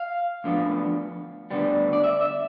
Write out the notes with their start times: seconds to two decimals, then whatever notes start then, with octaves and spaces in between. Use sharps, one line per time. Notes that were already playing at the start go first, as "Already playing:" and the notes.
Already playing: F5
0.44 D2 D3 F3 B3
1.51 D2 D3 G3 B3
1.93 D5
2.04 E5
2.21 E5